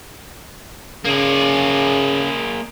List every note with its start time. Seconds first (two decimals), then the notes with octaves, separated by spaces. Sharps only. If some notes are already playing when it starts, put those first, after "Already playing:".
1.05 C#3 A#3 G#4